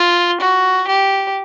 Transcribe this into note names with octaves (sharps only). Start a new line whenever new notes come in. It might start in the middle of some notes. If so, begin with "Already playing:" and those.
Already playing: F4
F#4
G4